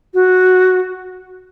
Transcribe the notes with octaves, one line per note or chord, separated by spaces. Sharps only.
F#4